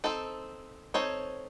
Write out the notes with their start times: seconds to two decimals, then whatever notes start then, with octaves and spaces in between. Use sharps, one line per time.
0.04 C4 D#4 A4
0.94 C4 D#4 A4 C#5